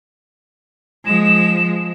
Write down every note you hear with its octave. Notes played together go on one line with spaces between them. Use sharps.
F3 G#3 E7